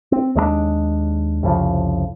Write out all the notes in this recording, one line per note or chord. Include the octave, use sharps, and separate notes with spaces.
C4
D#2 G#3 A3 D4
C2 F2 C#3 F3